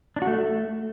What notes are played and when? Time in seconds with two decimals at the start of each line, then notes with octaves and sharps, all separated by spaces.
0.16 D4
0.22 F#4
0.27 A3